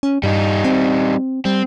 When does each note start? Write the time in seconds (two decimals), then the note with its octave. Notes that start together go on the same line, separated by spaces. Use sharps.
0.03 C#4
0.23 G2 G3 D#4
0.64 C4
1.45 G3 C4